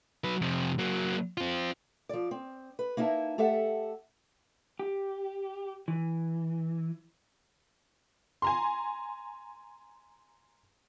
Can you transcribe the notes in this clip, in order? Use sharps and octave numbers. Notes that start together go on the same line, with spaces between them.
F#3 B4
F2 C3
F#3 A#3
C4 F4
F3 D5
C4
B4
A#3 D#4 E4 D#5 E5 A5
A3 G4 A4 E5 F#5
G4
E3
G#5 A#5 C6